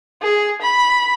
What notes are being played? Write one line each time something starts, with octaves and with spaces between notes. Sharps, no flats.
G#4
B5